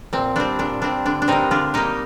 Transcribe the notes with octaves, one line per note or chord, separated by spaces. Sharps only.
A#2 C4
G3 C4 D4
A#2 D4
G3 C4 D4
D3 D4
D4
G3 A#3 C4 D#4
D3 D4 F4
G3 A#3 D#4 G4